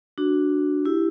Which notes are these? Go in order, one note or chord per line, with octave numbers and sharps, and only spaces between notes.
D4 F#4
E4 G4